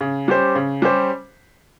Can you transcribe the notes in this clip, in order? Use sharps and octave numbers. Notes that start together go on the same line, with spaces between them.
C#3
G3 C#4 G4 C5
C#3
G3 C#4 G4 C5